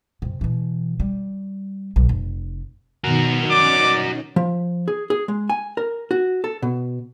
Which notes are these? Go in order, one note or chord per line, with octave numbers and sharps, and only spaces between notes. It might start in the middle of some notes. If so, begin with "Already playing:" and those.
F#2 C3
B2 E3
G3
B1
F1
B2 D#3 F#4 A#4
C#4 D#4 D5 D6
F3
G#4
G#4
G#3
G#5
A#4
F#4
A4
B2